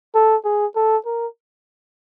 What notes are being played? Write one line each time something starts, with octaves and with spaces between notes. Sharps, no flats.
A4
G#4
A4
A#4